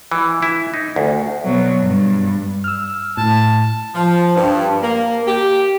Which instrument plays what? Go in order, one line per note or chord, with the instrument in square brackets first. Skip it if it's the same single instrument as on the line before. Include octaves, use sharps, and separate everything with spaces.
[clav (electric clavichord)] E3
E4
D#4
D2
[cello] B2 F#3
G2
[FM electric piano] E6 F6
[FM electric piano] A2 [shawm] A5
[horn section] F3
G2
A#3
G4